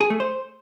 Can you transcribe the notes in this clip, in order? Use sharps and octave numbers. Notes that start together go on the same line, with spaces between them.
G#4
A3
C5